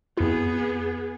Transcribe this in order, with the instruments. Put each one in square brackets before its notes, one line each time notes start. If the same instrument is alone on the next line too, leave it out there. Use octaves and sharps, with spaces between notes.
[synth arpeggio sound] F2 E4 [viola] B3 G#4